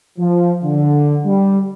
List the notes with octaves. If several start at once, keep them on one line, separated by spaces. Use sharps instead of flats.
F3
D3
G3